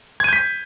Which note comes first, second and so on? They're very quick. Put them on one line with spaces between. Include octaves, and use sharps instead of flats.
G#6 D#7 G6 B6